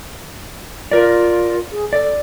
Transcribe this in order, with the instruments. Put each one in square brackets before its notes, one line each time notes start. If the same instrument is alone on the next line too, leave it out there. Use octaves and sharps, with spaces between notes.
[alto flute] F4 [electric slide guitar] A#4 D5
[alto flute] G#4
[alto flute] A4 [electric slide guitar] D5